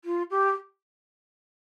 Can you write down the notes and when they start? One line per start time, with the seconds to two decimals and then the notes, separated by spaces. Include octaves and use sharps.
0.04 F4
0.30 G4